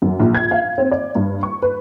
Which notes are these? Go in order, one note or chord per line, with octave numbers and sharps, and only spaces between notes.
F#2
A#1
G#6
F5
C4
D5
G2
C#6
B4